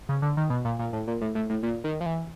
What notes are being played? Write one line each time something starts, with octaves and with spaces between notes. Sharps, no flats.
C#3
D3
D#3
B2
A#2
A#2
A2
A#2
A2
A2
A2
A#2
D#3
F3
E3